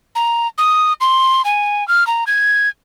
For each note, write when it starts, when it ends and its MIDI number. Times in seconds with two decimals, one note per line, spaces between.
0.15 0.47 82
0.58 0.93 87
1.01 1.42 84
1.45 1.86 80
1.88 2.06 89
2.07 2.24 82
2.27 2.69 92